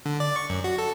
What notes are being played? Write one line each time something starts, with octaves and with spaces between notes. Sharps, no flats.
D3
D5
C#6
F#2
F#4
A4